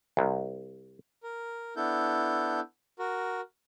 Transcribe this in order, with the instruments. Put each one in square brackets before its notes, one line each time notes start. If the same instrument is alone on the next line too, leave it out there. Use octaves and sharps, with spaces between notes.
[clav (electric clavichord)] C2
[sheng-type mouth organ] A#4
B3 D4 E4 A4 G6
F#4 A#4